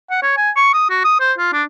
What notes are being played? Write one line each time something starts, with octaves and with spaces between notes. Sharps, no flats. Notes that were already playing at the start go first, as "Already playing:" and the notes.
F#5
C#5
G#5
C#6
D#6
F#4
D#6
C5
F4
D4